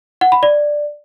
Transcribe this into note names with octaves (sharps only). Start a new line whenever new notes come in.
F#5
B5
D5